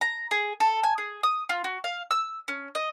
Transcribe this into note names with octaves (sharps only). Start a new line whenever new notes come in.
A#5
G#4
A4
G#5
G#4
D#6
F4
F#4
F5
E6
C#4
D#5